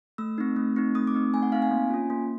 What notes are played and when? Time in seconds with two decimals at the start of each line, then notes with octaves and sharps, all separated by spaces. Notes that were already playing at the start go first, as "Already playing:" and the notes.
0.18 A3 E6
0.38 C4 D#4
0.56 A3
0.76 C4 D#4
0.95 A3 D#6
1.07 D6
1.14 C4 D#4
1.34 A3 G#5
1.42 F#5
1.52 C4 D#4 F5
1.62 G#5
1.71 A#3
1.90 C#4 F4
2.10 A#3